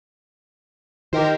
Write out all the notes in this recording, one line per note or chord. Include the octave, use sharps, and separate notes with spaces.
D#3 G4 A#4 C5